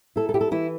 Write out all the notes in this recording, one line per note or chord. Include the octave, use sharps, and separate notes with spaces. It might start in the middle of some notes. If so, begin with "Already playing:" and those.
E4 A4
A4
E4 G4
A4
E3 E4